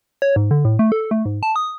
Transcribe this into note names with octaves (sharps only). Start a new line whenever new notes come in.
C#5
G#2
D3
A2
A3
A4
A3
G#2
A5
D#6